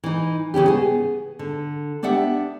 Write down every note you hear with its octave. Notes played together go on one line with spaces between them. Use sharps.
E3 D#4
C#3 E3 C#4 G4
B3 G#4
D3
B3 D4 G4 E5 F#5